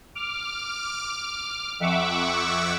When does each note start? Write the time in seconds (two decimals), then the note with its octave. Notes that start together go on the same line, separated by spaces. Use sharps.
0.15 D6 F6
1.80 F2 E5 F#5 C#6 D6 E6